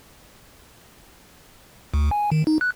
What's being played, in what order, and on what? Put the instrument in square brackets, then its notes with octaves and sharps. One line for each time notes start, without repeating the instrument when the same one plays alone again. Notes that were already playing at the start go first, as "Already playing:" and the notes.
[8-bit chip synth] D2
G#5
D#3
D#4
F#6